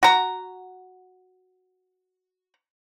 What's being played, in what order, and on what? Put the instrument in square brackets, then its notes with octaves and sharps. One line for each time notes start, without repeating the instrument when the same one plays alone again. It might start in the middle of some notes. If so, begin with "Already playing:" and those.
[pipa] F#4 A#5